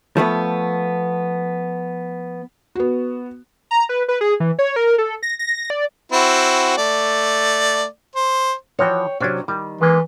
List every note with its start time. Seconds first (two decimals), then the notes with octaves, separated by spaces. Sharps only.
0.17 F3 A3 B3
2.76 B3 F#4
3.71 A#5
3.89 B4
4.08 B4
4.21 G#4
4.40 E3
4.59 C#5
4.76 A#4
4.98 A4
5.23 A#6
5.39 A#6
5.70 D5
6.12 C4 E4 F#4
6.78 A3 D5
8.16 C5
8.79 E3 F3 F#4 C#5 G5
9.20 C3 F#3 C#4 D4 G4
9.48 D#3 G3
9.81 E3 G#3 A#3